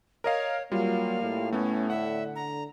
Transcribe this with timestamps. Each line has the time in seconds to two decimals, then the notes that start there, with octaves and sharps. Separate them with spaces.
0.24 A#4 C#5 D#5 F5
0.72 F#3 G3 A#3 F4 F5
1.23 A2
1.53 A3 B3 C#4
1.90 D3 E5 F#5
2.35 A#5